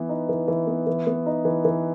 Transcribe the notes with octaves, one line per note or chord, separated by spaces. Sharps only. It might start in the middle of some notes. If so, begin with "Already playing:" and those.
Already playing: E3 B3
D#4
E3
E3
B3
E3
B3
D#4
E3
E3